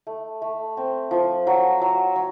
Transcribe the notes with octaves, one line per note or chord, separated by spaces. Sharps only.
A3
A3
C4
F3
F#3
F#3
F#3